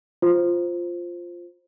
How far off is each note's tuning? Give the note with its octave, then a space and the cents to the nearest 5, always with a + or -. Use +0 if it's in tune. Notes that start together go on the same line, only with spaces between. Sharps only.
F4 +0 C5 +0